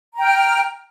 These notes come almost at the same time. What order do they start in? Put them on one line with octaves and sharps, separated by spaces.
A#5 G5 F6